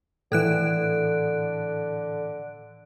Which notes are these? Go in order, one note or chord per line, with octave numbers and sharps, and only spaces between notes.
A2 D3 E3 A4 F#6 D7